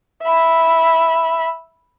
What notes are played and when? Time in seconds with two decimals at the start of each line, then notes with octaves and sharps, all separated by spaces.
0.23 E5 B5